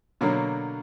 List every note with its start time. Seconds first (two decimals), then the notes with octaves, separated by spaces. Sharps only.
0.21 B2 D3 F#3 A#3